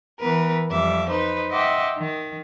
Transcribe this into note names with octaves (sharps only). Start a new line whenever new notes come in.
E3 B3 A#4 B4
F2 G3 E5 D6
D#4 B4 C5
D#5 E5 F#5 G5 C6 D6
D#3